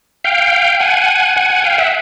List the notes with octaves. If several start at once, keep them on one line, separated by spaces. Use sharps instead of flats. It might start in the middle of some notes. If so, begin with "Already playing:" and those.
F5 G5
F#5 G#5
F#5 G#5
F#5 G#5
F5 G5
E5 F#5